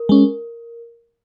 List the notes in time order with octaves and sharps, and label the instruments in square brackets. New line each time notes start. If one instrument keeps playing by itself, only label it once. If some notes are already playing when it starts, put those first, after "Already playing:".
Already playing: [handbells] A#4
[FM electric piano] G#3 C#4